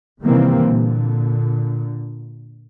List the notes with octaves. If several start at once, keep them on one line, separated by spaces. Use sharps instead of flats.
C3 D#3 E3 G3 A#3 C4
A#2 D3